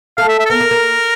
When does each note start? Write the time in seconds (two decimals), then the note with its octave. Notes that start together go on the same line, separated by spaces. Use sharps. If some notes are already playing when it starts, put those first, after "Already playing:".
0.18 A3 F5
0.28 E5
0.39 E5
0.45 A4
0.50 B3 A#4
0.61 A#3
0.71 A#3